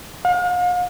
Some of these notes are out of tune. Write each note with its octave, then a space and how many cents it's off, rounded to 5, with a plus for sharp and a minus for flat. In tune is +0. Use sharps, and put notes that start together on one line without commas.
F5 +40